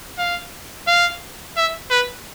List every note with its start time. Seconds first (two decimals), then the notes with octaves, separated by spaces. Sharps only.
0.18 F5
0.87 F5
1.57 E5
1.91 B4